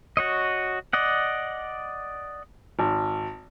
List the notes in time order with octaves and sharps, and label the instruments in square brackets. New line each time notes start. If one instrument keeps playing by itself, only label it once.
[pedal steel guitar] F#4 C#5 D#5
D5 D#5 F#5
[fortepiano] G#1